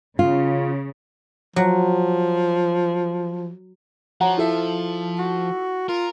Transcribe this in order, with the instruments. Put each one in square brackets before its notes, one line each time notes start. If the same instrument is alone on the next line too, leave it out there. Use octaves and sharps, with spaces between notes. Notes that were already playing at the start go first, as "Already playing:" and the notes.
[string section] C#3 [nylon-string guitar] F4
[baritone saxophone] F3 [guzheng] F#3
[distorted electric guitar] F3 [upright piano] F#4 C#5 [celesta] F#5 A#5
[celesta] E4 [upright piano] F4 A4 E5
[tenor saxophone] F#4
[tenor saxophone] F4 [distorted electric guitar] A#4